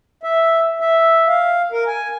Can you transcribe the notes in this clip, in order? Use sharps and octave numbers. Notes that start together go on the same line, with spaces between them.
E5
E5
F5
A#4
G#5